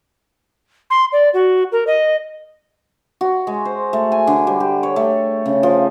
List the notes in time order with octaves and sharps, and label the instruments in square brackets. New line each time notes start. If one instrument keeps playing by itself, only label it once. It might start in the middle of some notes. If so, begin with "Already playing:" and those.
[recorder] C6
D5
F#4
A#4
D#5
[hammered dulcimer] F#4
G#3
C5
A3
G#5
D3
G3
G4
C#5
A3
C#3
F3